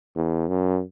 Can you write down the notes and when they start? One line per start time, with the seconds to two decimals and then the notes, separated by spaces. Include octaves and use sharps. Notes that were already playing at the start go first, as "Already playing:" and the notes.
0.16 E2
0.48 F#2